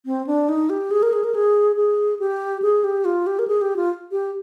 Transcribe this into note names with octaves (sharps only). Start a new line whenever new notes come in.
C4
D4
D#4
G4
G#4
A#4
G#4
A#4
G#4
G#4
G4
G#4
G4
F4
G4
A#4
G#4
G4
F4
G4